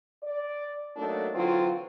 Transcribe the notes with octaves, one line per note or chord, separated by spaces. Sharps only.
D5
F#3 A3 A#3 D4 D#4
D3 E3 F#3 C4 F4